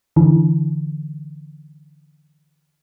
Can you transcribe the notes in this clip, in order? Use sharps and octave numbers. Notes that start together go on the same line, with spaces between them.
D3 E3